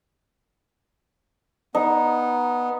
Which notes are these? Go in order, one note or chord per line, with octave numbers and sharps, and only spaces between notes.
B3 D#4